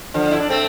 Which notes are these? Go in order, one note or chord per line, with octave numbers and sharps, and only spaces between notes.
D3 F3
E4
D4
A3 C4